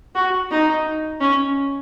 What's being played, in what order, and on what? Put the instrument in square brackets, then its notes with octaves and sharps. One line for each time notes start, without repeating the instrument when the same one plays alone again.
[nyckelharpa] F#4
D#4
C#4